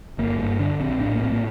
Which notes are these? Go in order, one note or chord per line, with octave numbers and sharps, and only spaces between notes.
G1 A#3
G2 A#3
D3 D4
A#1 C4
A2 D4
A#3
A#1 C4
A#3